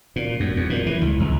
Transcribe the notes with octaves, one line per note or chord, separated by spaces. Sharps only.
A#2
F#2
E2
A#2
E3
C#2
C#2